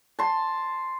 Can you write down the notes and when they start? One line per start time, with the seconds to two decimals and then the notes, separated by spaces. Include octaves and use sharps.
0.19 A5 C6